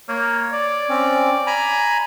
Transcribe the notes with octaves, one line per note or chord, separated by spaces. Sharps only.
A#3 C#5
D5
C4 C#4
G#5 A#5 B5